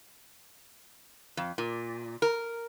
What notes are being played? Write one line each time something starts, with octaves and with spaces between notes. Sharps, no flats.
F2
A#2
A#4